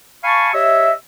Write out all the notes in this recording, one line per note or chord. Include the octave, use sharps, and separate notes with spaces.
F5 G#5 A5 B5 C#6
G4 C#5 D#5 E5